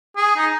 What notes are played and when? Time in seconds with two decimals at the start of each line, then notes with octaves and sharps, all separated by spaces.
0.17 G#4
0.36 D#4